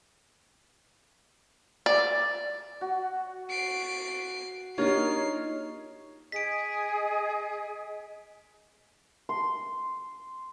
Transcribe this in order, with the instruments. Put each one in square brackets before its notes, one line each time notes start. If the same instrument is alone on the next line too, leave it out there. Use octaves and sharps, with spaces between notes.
[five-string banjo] D5
[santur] F#4
[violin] C7 D7
[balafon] A#3 D4 G4 [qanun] D#4 F4 [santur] A#4 C#5 [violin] C7
[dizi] G#4 [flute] D#5 [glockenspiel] B6 D7
[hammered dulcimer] C6